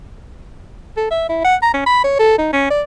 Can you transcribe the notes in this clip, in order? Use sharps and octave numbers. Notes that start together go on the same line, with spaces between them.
A4
E5
E4
F#5
A#5
C#4
B5
C#5
A4
D#4
C#4
D5